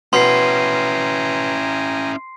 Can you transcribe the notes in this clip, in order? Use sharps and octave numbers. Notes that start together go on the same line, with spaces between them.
B2 C#4 E4 G5 G#5 A#5 C6 C7